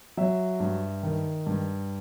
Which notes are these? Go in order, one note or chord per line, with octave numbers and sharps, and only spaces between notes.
F#3 E5
G2
D#3
G2